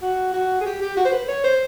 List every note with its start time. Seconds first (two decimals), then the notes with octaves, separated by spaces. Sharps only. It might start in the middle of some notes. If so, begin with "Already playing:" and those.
0.02 F#4
0.34 F#4
0.61 G#4
0.66 G4
0.81 G4
0.97 F#4
1.05 C5
1.12 B4
1.28 C#5
1.44 C5